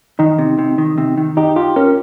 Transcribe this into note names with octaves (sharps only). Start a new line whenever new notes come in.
D#3 D#4
C3
C3
D#3
C3
D#3
D#4 G4
F4 G4
C#4 A#4